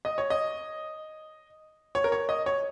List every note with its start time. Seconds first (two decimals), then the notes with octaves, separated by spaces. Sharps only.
0.05 D#5
0.18 C#5
0.30 D#5
1.95 C#5
2.04 A#4
2.12 C#5
2.29 D#5
2.46 C#5